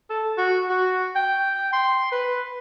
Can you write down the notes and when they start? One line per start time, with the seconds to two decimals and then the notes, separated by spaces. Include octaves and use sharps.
0.10 A4
0.38 F#4
0.69 F#4
1.16 G5
1.73 C6
2.12 B4